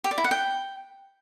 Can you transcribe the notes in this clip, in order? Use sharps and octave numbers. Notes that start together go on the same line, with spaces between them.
G4
D5
E4
F#5
G5